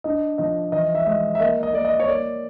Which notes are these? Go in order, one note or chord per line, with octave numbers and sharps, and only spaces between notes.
D4 D#5
F3 D#5
E3 D#5
E5
G#3 D#5
E5
A#3 D#5
D#5
A#3 D5
D#5
C#5
A#3 D5